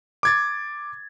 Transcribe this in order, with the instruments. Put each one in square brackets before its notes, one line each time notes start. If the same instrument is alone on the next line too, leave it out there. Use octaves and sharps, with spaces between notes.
[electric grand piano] D6 G#6 A6